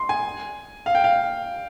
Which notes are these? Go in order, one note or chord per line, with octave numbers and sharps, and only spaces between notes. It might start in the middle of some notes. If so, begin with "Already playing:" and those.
Already playing: C6
G#5
F5
G5
F5